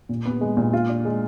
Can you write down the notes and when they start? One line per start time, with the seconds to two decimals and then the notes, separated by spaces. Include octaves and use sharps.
0.09 A#2
0.26 B3
0.41 G#3
0.57 A#2
0.73 F4
0.89 D4
1.05 G#3